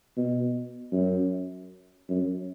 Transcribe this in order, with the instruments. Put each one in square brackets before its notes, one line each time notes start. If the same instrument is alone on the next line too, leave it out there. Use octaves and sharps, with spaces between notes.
[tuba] B2
F#2
F#2